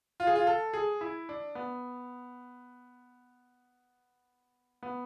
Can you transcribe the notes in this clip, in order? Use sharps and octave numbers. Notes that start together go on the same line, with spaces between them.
F4
G#4
F4
A4
G#4
E4
D4
B3
B3